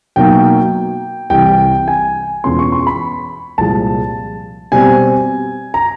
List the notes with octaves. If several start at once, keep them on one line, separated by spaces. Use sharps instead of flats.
B2 F#3 A#3 D#4 G5
C2 C3 E3 G5
G#5
E2 B2 G#3 C#4 F4 C6
C#6
C6
B5
C2 A#2 F3 G#3 A5
B2 G3 C4 G#5
A#5